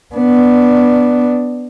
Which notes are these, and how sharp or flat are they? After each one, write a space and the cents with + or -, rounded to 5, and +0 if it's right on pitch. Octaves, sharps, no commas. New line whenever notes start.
B3 +0 D4 +0